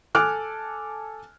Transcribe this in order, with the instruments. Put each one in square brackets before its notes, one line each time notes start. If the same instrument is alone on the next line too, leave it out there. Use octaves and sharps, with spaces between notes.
[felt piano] A4 G#5 A5 D6 F6 F#6